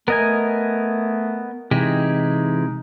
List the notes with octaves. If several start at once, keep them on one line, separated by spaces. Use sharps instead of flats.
A3 B3 A#4 D#5 G#5
C3 E3 G#3 D#4 E4 G4